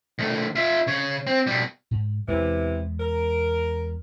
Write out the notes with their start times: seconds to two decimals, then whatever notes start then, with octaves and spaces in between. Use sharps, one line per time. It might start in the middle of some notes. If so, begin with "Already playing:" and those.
0.19 D#3 A3
0.55 F4 E5
0.87 C#3 C#5
1.27 C4
1.47 B2 G3
1.91 G#2
2.28 E2 C3 E3 G#3 B3
3.00 A#4